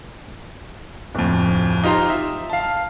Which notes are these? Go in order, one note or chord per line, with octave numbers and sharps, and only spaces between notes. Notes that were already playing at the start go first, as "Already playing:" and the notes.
D1 F2
D#4 F4 G4 C5 A#5
E5
F5 A5